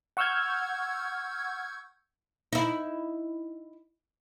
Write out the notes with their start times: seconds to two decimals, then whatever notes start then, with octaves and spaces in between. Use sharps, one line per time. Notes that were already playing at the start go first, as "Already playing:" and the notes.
0.17 F#5 C#6 E6 F6 G6 G#6
2.53 D#4 E4